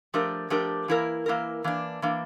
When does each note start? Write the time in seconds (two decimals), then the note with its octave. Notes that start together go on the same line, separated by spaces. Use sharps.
0.14 F3 A3 D4 G4 A#4
0.50 F3 A3 D4 G4 A#4
0.88 E3 A#3 E4 A#4
1.26 E3 A#3 E4 A#4
1.64 E3 A#3 D4
2.02 E3 A#3 D4